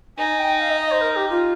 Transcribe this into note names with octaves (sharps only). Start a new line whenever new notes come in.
D#4 G#5
G5
F5
D#5
D#5
C5
A#4
G4
F4